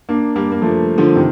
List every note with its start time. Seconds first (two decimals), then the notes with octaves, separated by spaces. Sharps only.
0.09 A#3 D4
0.35 G3 A#3
0.52 A#3
0.62 F3 A3
0.98 D3 F3
1.15 C3 D#3